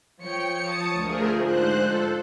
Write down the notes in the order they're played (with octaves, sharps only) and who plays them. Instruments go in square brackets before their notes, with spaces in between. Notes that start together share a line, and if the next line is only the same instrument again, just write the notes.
[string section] F3 C#5 C#7 [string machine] G5
[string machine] A5 D#6
[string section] D2 F3 [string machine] A3 G#4 A#4
[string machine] G#2 C5 F#6
A4